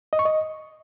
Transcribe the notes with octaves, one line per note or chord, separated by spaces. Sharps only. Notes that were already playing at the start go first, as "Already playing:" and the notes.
D#5
C#6
D#5